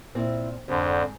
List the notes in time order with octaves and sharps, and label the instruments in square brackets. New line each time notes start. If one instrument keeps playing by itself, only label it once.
[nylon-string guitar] A#2 C4 [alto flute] E4
[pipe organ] F2 [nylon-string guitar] G#2 [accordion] D3 [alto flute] C5